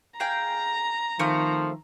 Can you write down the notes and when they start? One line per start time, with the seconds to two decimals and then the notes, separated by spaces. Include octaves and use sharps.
0.20 G#4 F5 G5 A#5
1.19 D#3 F3 A3 C4 F5